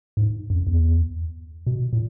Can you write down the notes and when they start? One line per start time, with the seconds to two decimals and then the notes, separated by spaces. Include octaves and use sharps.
0.17 G#2
0.50 F#2
0.67 E2
1.67 B2
1.93 A#2